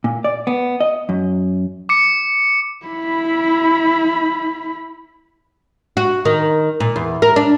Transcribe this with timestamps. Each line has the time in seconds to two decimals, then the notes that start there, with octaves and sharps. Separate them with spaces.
0.04 A#2
0.24 D5
0.47 B3
0.80 D#5
1.09 F#2
1.89 D6 C#7
2.86 E4 B5
5.97 F#4
6.25 D#3
6.80 A#2
6.96 E2
7.22 A#4
7.36 D4